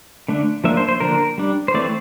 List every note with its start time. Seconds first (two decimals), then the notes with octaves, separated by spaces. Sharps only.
0.28 D3 A3 D4
0.64 F3 A#3 D4 E5
0.77 C5
0.89 C5
1.00 D3 F3 A#3 D4 A#4
1.38 G3 D4
1.68 C5
1.74 E3 A3 C4 D5